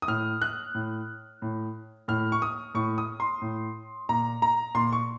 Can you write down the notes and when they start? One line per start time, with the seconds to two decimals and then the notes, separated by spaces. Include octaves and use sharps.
0.02 D#6
0.08 A2 F6
0.42 F#6
0.74 A2
1.42 A2
2.08 A2 F6
2.32 C#6
2.42 D#6
2.74 A2 C#6
2.98 D#6
3.20 C6
3.42 A2
4.09 A#2 A#5
4.42 A#5
4.75 A#2 C6
4.92 C#6